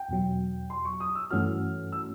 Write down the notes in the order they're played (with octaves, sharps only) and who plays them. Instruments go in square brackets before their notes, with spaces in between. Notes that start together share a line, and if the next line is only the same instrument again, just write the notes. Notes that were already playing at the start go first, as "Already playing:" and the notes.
Already playing: [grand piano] G5
[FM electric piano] E2 B2 F#3
[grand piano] C6
C#6
D#6
E6
[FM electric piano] G2 E3 A3 C#4 F#4 [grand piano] F6
[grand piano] E6